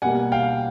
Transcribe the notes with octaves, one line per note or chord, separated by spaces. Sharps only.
B2 G3 A#3 F#5 G#5
F5 G5